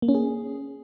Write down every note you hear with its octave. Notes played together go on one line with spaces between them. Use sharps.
A#3
C#4
G#4